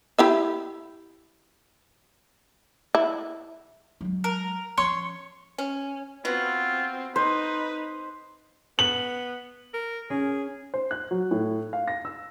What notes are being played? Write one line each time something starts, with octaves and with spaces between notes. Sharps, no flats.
E4 G4 E5
E4
F#3 G#3
A#4
F3 C#4 C#5 C6 C#6
C#4
B3 C4 F4 F#4
D#4 B4 C5
B3 F#7
A#4
C#4 G#4
C5
F#6
F#3
A2
F5
A#6
E6